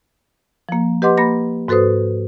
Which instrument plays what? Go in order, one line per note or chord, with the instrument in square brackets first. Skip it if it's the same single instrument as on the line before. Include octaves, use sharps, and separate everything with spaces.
[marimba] F3 A#3
G4 B4 D#5 F#5 C6 D6
A#3 B5 A#6
G#2 F#4 A4 B4 C5 D#6